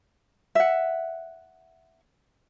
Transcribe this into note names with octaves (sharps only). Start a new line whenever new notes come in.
E5 F#5